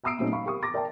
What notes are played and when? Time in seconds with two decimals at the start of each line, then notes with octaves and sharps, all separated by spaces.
0.04 E5 A#5 D#6 E6 C7 D7
0.19 A#2 F#3 A3 C4 C#4 D#4
0.32 F5 B5 C#6
0.46 G4 A#4 C#6 D#6
0.63 D6 A6 A#6
0.74 A#4 D5 E5 G5 A5